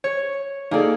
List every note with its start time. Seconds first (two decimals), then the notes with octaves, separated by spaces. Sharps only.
0.04 C#5
0.71 A#3 D#4 G#4 A4 D5